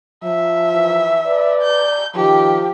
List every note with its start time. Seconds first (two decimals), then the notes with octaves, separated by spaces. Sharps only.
0.24 F3 E5
0.73 E3
1.26 B4 D5
1.62 G6
2.16 D#3 F3 G4